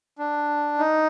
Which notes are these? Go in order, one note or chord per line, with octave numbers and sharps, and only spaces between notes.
D4
D#4